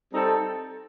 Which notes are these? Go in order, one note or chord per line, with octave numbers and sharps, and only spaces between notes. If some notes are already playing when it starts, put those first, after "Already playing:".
G3 C4 D#4 A4